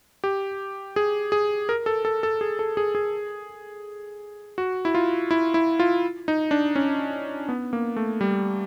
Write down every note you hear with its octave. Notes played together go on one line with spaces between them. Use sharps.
G4
G#4
G#4
A#4
A4
A4
A4
G#4
A4
G#4
G#4
F#4
E4
F4
E4
E4
F4
D#4
D4
C#4
B3
A#3
A3
G3